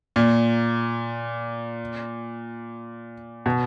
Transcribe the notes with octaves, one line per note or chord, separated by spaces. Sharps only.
A#2
B2